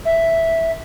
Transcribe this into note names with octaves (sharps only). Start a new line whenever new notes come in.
E5